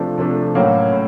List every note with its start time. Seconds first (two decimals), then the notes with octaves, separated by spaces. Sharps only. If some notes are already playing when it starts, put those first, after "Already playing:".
Already playing: C3 F3 A3 D4
0.18 C3 F3 A3 D4
0.55 A2 F#3 A#3 C#4
0.92 A2